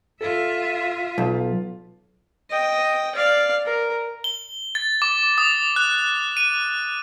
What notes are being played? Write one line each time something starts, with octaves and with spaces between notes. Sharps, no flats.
F4 A4 E5
B1 F4
D#5 G5
D5 F5
A#4
G7
A6
D6
D#6
F#6
D#7